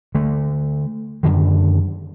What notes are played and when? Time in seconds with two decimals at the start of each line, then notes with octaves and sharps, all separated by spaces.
0.15 D3 A3
1.23 F#2 B2 D3 D#3